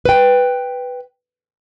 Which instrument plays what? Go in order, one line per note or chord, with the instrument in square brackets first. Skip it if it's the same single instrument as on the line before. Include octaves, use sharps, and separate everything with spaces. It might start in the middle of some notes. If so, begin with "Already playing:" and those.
[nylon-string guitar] B4 G5